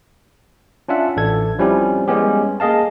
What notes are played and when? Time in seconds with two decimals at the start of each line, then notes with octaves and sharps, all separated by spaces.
0.88 C#4 D4 F4 E5 F#5
1.17 A1 D4 A4 G#6
1.59 F3 G3 C4 C#4 E4 G4
2.08 G3 G#3 B3 C#4 G4
2.60 A#3 G#4 D#5 F5 A5